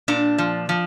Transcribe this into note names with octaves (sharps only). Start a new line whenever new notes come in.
A#2 D4
F3
F3